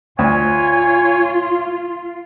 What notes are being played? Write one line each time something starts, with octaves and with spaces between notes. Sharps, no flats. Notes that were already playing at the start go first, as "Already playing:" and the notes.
D2 F4 C#5 G#5